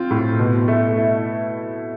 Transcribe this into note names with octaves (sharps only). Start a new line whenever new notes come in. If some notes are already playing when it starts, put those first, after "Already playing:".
Already playing: C4 F4
A2
B2
A3
E4